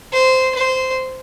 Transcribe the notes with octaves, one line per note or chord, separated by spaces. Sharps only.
C5
C5